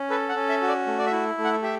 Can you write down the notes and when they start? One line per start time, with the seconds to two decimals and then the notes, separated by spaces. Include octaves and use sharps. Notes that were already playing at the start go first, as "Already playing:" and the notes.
Already playing: C#4
0.10 A4 B4
0.29 F#5
0.35 C#4
0.49 E5
0.62 F#4
0.68 D5
0.87 A3
0.98 D5
1.06 E5
1.12 E4
1.38 A3
1.44 F#5
1.62 G4 E5